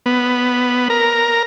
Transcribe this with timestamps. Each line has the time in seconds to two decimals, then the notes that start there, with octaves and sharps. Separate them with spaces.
0.06 B3
0.90 A#4